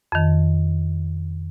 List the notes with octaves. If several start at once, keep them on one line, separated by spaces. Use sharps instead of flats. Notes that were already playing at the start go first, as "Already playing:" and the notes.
F2 D#3